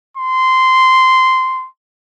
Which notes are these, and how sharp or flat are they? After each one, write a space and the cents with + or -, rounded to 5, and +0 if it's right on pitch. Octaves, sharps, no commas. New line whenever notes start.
C6 -10